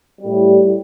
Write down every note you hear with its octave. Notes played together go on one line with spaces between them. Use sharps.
A2 G3